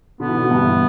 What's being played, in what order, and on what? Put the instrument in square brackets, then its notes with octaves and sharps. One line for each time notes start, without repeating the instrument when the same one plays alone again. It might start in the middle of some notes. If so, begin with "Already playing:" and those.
[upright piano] B2 D3 [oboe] B3
[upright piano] E3
B2 D3
E2 G2